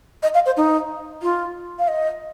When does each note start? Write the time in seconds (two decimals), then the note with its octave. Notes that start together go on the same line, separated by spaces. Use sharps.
0.23 D#5
0.34 F5
0.46 C5
0.57 D#4
1.22 F4
1.79 F5
1.88 D#5